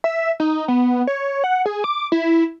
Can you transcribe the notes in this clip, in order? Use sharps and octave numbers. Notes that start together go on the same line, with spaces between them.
E5
D#4
B3
C#5
F#5
G#4
D6
E4